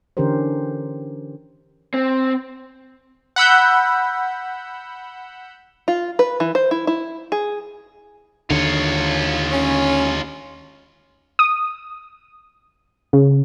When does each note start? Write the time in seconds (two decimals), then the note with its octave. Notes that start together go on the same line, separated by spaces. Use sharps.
0.17 D3 E3 C#4 G4 A#4 C5
1.94 C4
3.36 F#5 B5 E6 G6
5.88 F4
6.19 B4
6.40 E3
6.55 C5
6.71 E4
6.87 E4
7.32 G#4
8.50 D#2 D3 F4 C#5
9.52 C#4
11.39 D#6
13.13 C#3